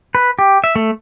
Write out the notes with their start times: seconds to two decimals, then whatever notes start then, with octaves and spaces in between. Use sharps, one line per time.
0.15 B4
0.39 G4
0.64 E5
0.76 A3